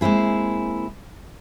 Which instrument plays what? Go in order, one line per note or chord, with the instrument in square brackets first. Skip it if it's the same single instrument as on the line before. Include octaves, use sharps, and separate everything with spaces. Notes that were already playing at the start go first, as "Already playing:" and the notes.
[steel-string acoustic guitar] G#3 A#3 C4 E4 G#4